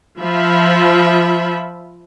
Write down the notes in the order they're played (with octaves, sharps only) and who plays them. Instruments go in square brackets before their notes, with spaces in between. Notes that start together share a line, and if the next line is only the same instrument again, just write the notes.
[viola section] F3 F4 E5 B5